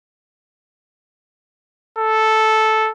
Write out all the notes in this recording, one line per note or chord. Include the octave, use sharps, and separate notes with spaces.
A4